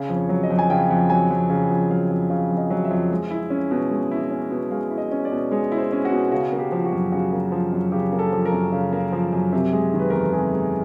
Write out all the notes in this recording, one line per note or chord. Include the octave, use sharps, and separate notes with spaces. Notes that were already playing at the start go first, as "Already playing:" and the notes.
Already playing: C#3
F2
C#5
F#3
D#5
F2
G#5
C#3 G5
F2
F#3 G#5
F2
C#3
F2
F#3 F5
F2
C#3
F2
D#5
F#3
E5
F2
G#3
E4
C#4
B2
G#3
E4
C#4
B2
G#3 F5
E4
D#5
C#4
D5
B2
G#3 C#5
E4
C5
C#4
F#4
B2
C#3 F#4
A#3
G4
F3
F#4
F#2
C#3 F#4
A#3
F3
F#2
C#3 G4
A#3
A4
F3
A#4
F#2
C#3
A#3
F3
F#2
C3
G#3
D#3
B4
E2 A#4
A4
C3 G#4
G#3